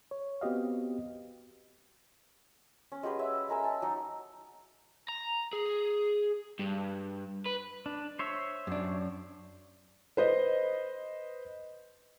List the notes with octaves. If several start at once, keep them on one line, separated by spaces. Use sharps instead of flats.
C#5
B3 C4 F#4 G4 D#5 F5
C#4
G#3 F#4 G4 B4
C#5 E5
G#3 A#4 G#5 E6
A5
F#3 D#4
A#5
G#4
G2
B4
D4
C5 C#5 E5
F#2 D4
B4 C5 D#5